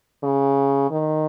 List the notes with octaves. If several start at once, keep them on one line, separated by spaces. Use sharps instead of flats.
C#3
D#3